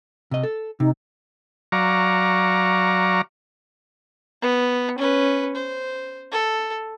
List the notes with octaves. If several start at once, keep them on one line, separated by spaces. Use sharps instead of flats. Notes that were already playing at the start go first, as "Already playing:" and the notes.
C3 D#5
A4
C3 D#4
F#3 D5 F5 A#5 C#6
B3
C#4 B4
C5
A4